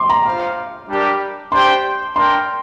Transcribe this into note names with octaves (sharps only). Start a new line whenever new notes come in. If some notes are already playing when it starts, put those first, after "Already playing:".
Already playing: C6 D6
A#5
F4 C5 F5
G3 D4 G4 A#4 D5
D4 G4 C5 G5 C6
D4 A#4 G5 C6